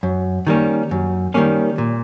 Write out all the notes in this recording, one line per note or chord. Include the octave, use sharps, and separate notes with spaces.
F#2
D#3 G3 A#3 C#4
F#2
D#3 G3 A#3 C#4
A#2